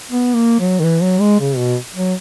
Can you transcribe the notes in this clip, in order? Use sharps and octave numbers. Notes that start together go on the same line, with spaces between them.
B3
A#3
F#3
D#3
E3
F#3
G#3
C#3
B2
F#3